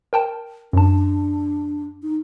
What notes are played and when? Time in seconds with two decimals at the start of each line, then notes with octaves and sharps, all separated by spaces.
0.13 A#4 G5 A5
0.73 F#2 D4 A5
2.03 D#4